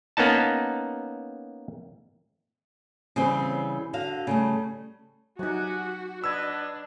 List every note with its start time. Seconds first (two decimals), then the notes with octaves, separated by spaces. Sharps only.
0.17 A#3 B3 C#4 D#4 A5
3.16 C#3 E3 G3 C4
3.93 D3 F#4 F5
4.27 C#3 G3 A3
5.39 F#3 D#4 F#4 G4 F#5 G#5
6.24 D4 B4 D#5 F#5 E6 G#6